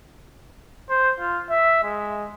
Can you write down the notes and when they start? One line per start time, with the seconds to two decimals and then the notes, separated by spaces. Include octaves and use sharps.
0.90 C5
1.20 F4
1.50 E5
1.84 G#3